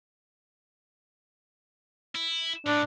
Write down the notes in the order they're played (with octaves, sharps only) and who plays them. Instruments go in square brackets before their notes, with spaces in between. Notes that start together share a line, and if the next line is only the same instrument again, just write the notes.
[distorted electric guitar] E4
[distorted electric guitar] A2 [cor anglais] D4